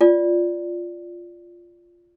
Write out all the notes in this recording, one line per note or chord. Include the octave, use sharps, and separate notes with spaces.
F4 D5